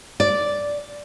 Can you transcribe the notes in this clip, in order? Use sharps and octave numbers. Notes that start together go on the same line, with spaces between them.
D5